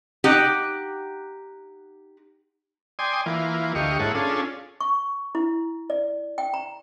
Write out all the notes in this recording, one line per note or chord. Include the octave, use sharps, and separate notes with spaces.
D#4 G4 F#5
D5 G5 G#5 C6 D#6
E3 A#3 F4
D2 G4 D#5 F5 C#6
G#2 A#3 E4 A4 C#5 F#5
C#4 D4 F4 G#4 A4
C#6
E4
D5
G5
A#5